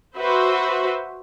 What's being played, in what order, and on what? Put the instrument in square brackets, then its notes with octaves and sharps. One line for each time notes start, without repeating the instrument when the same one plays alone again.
[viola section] F#4 B4 C5 E5